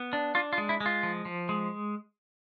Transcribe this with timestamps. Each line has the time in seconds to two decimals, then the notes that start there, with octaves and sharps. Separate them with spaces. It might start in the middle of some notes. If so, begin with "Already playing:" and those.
Already playing: B3
0.13 D4
0.35 D4 F4
0.53 F4
0.58 G#3
0.69 E4
0.80 G#3
0.86 F4
1.03 F3
1.25 F3
1.49 G#3